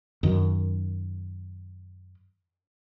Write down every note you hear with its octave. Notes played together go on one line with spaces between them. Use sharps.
F#2 D#3